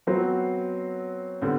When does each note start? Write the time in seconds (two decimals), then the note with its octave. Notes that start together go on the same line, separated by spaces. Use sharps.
0.07 F#3 B3 C4 F#4 C5
1.42 D3 G3 B3 C4